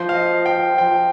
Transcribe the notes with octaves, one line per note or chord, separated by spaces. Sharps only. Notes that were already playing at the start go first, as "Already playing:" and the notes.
Already playing: F3 C5
F5
D#5
G5
F3 G5